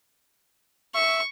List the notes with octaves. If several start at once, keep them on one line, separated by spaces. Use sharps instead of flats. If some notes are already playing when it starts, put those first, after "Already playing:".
E5 C#6